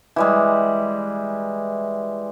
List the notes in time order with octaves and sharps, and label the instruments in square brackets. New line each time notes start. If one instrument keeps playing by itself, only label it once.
[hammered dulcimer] E3 G3 G#3